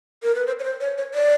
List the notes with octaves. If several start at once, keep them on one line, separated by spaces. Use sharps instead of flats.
A#4
B4
C5
C#5
C5
C#5
C#5
D5